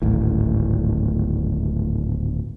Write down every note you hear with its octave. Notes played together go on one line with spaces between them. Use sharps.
D1 G#1 A2